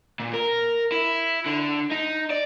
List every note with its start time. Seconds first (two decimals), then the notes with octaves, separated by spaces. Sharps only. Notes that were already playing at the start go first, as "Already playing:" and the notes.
0.20 A#2
0.34 A#4
0.92 E4
1.46 D3
1.91 D#4
2.30 D5